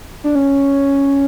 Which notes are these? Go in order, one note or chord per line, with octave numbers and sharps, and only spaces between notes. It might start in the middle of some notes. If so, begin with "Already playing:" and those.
D4
C#4